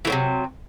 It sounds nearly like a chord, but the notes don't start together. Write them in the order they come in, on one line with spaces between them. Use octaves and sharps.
E3 A2 F#3 C3